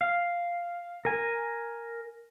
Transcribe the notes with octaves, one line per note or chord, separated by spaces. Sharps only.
F5
A#4 G#5